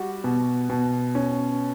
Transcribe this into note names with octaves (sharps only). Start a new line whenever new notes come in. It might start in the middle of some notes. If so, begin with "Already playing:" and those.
Already playing: G3 F#4
B2
B2
C#4